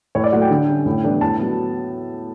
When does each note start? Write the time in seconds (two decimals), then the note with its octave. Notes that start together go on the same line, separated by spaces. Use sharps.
0.15 A2 C#5
0.24 D5
0.32 F#3 F#5
0.35 A3
0.42 G5
0.50 D3
0.68 G3 C#4
0.86 A2
1.04 E3 G3 B3 D4
1.21 A2 A5
1.39 F#3 B3